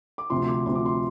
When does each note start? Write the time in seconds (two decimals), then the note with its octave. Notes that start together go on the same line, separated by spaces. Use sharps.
0.18 D6
0.30 D2 C3 F3 C6
0.48 D6
0.66 D2 C3 F3 C6
0.75 D6
0.86 C6